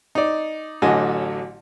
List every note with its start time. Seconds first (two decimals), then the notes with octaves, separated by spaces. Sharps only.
0.15 D#4 D5
0.82 A1 D3 F#3 D#5 G#5 A5